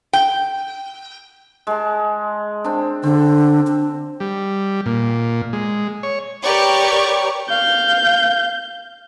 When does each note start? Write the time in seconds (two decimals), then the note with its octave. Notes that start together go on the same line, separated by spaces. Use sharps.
0.13 G5
1.67 G#3 A5
2.64 C4 D4
3.03 D3 C4
3.67 D4
4.20 G3
4.86 A#2
5.53 G#3
6.03 C#5
6.43 G4 A#4 B4 C#5 D5 C#6
7.49 F5 G6